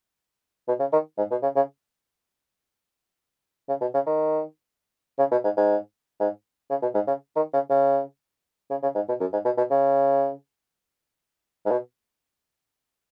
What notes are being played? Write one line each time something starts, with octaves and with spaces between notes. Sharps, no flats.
B2
C#3
D#3
G#2
B2
C#3
C#3
C#3
B2
C#3
D#3
C#3
B2
G#2
G#2
G#2
C#3
B2
G#2
C#3
D#3
C#3
C#3
C#3
C#3
G#2
B2
F#2
G#2
B2
B2
C#3
G#2
B2